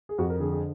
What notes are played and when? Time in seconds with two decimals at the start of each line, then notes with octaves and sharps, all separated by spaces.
0.09 G#4
0.18 F2 F#4
0.30 A#4
0.40 D3 G#4
0.52 G#4